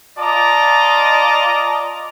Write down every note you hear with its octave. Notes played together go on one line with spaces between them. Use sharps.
F4 D5 D#5 A5 A#5 D6